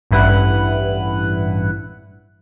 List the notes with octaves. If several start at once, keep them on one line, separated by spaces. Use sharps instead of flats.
A1 G2 E4 B4 F#5 F#6